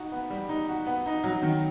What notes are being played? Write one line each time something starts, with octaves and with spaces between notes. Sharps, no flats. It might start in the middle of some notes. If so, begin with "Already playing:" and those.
Already playing: D#4 F#4
B3
G3
D#4
F#4
B3
D#4
F#3
D#3